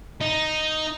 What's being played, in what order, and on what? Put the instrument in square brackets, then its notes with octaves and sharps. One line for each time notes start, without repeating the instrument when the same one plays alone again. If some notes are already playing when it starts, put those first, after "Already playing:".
[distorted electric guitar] D#4